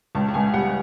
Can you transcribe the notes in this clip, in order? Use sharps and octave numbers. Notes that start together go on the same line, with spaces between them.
C#2 A5
A5
C#2 G#5
G3 F#5